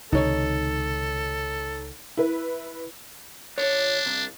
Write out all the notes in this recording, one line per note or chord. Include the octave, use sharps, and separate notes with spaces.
C#2 C3 D#3 D#4 A4 C#5
E4 B4
C#2 D4 C#5
C2